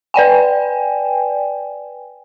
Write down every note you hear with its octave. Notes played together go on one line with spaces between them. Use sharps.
B4 D5 G5 G#5